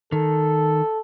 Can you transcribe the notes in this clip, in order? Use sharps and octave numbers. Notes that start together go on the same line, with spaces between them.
D#3 A4